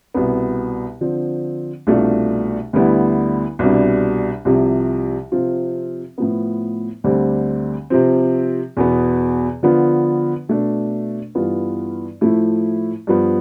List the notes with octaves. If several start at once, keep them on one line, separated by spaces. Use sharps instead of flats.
C2 B2 B3
D3 F3 C4
C2 B2 A3 D4 F4
D2 D3 G3 B3 E4
C2 B2 G3 D4
C2 C3 F3
C3 F3 C4 F4
A2 F3 B3
D2 D3 G3 C4 G4
C3 F3 C4
E2 B2 B3
D3 F3 B3 F4
B2 A3 D4
G2 E3 B3 F4
A2 F3 A3 E4
G2 F3 B3